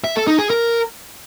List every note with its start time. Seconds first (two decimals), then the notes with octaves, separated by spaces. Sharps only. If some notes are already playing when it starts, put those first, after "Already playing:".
0.04 E5
0.16 A4
0.27 D#4
0.39 G#4
0.50 A#4